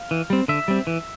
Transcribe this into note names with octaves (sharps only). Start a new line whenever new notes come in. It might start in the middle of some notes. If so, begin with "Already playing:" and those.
Already playing: F5
E3
G3 C4
D3 E5
G3 C4
E3